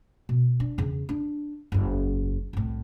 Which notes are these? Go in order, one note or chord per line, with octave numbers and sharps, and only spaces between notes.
B2
D4
E2 C#3
D4
F#1 E2
C2 A2